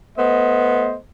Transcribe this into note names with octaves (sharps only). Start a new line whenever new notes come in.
A3 B3 C5 D#5